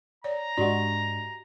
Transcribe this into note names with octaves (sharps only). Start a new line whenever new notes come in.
C#5 D5 A#5
G#2 D4 F#4 G4 D5 D#5 F#5